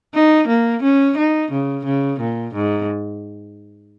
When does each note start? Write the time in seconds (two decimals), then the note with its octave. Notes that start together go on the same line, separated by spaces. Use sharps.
0.14 D#4
0.48 A#3
0.83 C#4
1.18 D#4
1.52 C#3
1.85 C#3
2.21 A#2
2.55 G#2